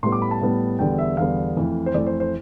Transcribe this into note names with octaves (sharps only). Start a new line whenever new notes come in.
A2 G3 B3 C6
D6
B5
A5
A2 G3 B3
E2 D3 G3 B3 G5
E5
E2 D3 G3 B3 F5
F2 E3 A3
C5
F2 E3 A3 D5
C5
C5